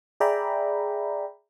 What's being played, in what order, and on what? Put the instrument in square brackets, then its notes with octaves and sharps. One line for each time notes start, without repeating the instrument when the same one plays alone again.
[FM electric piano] G#4 D5 E5 G5 A#5 B5